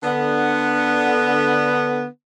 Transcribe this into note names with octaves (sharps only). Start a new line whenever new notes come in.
D3 B3